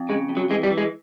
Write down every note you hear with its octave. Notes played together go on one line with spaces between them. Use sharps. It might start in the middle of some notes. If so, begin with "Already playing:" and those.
Already playing: F2
C#3 G#3
F2
F#3
E3 G#3
G3
E3
G#3